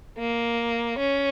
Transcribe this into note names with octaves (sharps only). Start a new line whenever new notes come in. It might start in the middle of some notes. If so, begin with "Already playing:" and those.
A#3
C#4